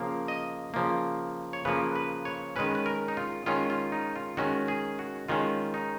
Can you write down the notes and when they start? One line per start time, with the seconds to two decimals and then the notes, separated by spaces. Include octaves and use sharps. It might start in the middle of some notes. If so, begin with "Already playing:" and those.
Already playing: C#3 F3 A#3 F5
0.28 D#5
0.74 C#3 F3 A#3
1.53 C#5
1.65 C#3 F3 A#3 B4
1.96 B4
2.25 C#5
2.56 D#3 G#3 C#4 B4
2.75 B4
2.86 A#4
3.08 D#4
3.17 F4
3.46 D#3 G#3 C#4 F4
3.70 F4
3.92 D#4
4.16 F4
4.37 D#3 G#3 C#4 F#4
4.68 G#4
4.99 F#4
5.28 D#3 G#3 C#4 F4
5.74 D#4